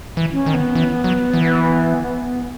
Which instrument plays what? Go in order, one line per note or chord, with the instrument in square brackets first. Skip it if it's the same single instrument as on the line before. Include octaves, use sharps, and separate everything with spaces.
[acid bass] E3
[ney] C#4
[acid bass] D#3
[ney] B3
[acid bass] E3
F#3
E3